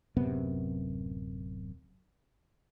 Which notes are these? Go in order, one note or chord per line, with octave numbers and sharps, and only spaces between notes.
D1 F#2 C3 B3